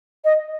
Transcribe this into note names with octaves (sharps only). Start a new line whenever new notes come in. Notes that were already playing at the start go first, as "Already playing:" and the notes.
D#5